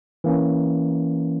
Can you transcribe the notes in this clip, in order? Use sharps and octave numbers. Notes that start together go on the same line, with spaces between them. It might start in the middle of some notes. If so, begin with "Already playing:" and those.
E3 A#3 C#4